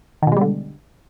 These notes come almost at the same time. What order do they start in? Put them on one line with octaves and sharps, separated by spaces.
D#3 B2 G#3 G3 D3